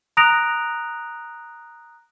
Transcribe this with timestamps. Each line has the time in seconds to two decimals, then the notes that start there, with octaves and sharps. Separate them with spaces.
0.17 A#5 D#6 F#6 A#6 D7 F7